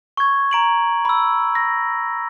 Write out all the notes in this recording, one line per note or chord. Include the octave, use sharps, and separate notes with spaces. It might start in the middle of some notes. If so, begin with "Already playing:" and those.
C#6 G#6
A#5 D7 F#7
B5 E6
A#6